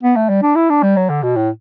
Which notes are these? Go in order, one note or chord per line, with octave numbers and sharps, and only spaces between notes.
B3
A3
G3
D4
E4
D4
G3
F#3
D3
B2
A2